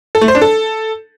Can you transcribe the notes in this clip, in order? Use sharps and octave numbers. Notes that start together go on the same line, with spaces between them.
A4
A3
C5
D4
A4